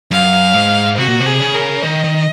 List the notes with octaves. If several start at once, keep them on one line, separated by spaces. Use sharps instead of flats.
F#2 F5
G#2
C3 F#4
A#2
C3
G#4
C#3
A#4
D#3 D#5
D#3